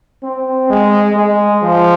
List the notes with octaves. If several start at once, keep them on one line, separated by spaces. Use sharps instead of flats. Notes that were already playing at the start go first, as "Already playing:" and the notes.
C4
G#3
G#3
F3